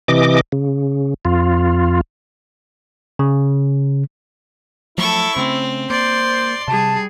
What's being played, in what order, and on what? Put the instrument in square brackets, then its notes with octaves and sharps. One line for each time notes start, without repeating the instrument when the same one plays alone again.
[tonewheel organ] C3 E3 D#5 D6
C#3
F2 F4
[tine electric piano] C#3
[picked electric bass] F3 F#3 A3 [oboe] E4 [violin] A4 C#6
[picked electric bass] C#3 A3 C#4 [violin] C4
[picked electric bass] A#3 [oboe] C5 [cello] D5 [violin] C6
[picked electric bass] C3 [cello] G3 G#4 [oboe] A5